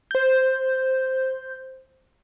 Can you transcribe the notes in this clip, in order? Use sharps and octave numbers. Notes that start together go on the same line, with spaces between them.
C5 G6